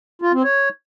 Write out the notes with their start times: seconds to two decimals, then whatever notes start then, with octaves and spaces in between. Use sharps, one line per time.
0.22 F4
0.33 C4
0.44 C#5